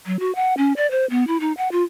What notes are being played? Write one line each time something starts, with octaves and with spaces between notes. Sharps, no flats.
F#3
F#4
F#5
C#4
D5
C5
B3
E4
D#4
F#5
F4